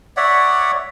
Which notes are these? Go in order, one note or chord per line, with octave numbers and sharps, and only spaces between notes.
C#5 D5 E5 F#5